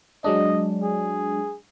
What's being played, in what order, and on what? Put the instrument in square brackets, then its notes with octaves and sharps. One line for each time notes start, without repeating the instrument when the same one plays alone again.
[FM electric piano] F#3 G#3 D4 [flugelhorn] D#5
[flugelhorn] G#4